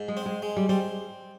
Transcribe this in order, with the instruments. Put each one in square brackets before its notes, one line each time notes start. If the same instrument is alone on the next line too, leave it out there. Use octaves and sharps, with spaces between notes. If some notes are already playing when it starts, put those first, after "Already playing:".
Already playing: [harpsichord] G#2
[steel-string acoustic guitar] G#3
[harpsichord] C4
[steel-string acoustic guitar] G#3
[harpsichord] G#3
[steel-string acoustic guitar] G3
[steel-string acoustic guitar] G3 [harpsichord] C4